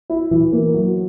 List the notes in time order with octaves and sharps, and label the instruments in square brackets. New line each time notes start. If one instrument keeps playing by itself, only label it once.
[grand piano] E4
E3
A#3
F#3